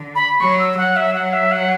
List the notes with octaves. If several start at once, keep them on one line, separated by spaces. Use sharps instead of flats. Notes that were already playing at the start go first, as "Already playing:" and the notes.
Already playing: D3
B5
F#3 C#6
E6
F#3 F#5
E5
F#5
E5
F#5